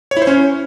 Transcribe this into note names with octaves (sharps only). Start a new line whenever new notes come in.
C#5
E4
C5
C#4